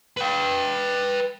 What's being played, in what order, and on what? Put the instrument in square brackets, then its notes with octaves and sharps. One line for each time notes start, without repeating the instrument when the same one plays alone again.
[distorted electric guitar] B4 G5